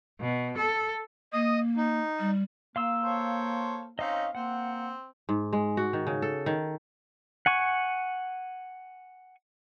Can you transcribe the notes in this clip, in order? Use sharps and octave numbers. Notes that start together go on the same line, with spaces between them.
B2
A4
A#3 D#5 D#6
D#4
G3
A#3 F5 C6 E6
A4 C5 C#5
C4 C#4 D#4 D#5 F5
A#3 C4 F#5
G#2
G#3
F#4
D#3
C#3
A4
D#3
F#5 G#5 C#6